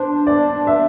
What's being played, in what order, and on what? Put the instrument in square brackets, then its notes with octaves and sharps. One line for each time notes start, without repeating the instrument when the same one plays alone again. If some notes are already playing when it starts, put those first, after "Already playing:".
Already playing: [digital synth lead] D4 [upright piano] C5
[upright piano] D5
E5